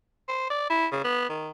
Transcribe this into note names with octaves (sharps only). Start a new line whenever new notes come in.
C5
D5
E4
C#3
B3
D#3